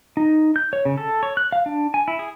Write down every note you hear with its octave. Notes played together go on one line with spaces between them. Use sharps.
D#4
G6
C#5
C#3
A4
C#5
F#6
F5
D4
G#5
E4
G#4